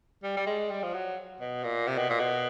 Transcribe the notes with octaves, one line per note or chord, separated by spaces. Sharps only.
G3
G3
G#3
G3
F3
F#3
B2
A#2
C3
B2
A#2
B2